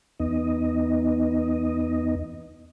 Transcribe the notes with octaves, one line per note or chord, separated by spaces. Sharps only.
E2 B3 D#4 D#5